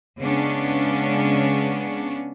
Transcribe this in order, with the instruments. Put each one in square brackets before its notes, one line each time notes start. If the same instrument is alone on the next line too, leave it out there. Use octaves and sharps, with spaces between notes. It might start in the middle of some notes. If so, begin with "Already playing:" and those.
[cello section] C#3 G#3 B3 C#4 D4